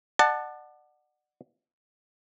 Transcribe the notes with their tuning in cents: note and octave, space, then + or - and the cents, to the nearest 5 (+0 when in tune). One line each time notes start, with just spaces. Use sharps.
D5 +35 F#5 +0 A5 +0